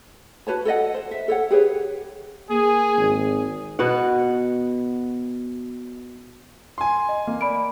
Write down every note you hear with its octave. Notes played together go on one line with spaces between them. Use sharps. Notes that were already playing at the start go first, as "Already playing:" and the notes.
F#4 B4 C#5 A5
A4 D5 D#5 F#5
C5
E5
A4 C#5 F#5
G4 G#4 B4 C#5
A#3 G#4
G#1
B2 B3 F#4 F#5
G#5 C6
D#5
A#3
D5 B5 D7